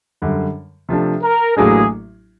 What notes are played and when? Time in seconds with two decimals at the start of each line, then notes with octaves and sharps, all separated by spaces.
0.22 F#2 D3 G3
0.89 C3 F3 A3 D4
1.23 A#4
1.57 A1 A2 F#3 A#3 D4 G#4